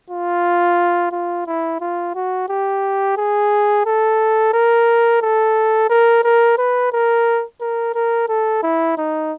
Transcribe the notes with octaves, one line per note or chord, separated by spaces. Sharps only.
F4
F4
E4
F4
F#4
G4
G#4
A4
A#4
A4
A#4
A#4
B4
A#4
A#4
A#4
A4
E4
D#4